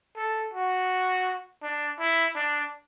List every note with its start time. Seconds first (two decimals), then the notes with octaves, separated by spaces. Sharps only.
0.16 A4
0.54 F#4
1.62 D4
1.99 E4
2.35 D4